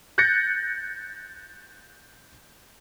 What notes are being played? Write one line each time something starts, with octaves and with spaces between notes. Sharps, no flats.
F#6 G6 A6 A#6 C#7